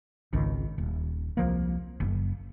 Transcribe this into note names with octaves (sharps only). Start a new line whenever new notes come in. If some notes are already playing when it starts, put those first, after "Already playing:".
G#1 C#2 D#3
D#1
C2 F3 A#3
F#1